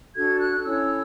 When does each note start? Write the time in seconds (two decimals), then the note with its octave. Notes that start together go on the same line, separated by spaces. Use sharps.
0.16 D4 F#4 A4 G#6
0.40 F#6
0.64 C#4 E4 A4 C#5 E6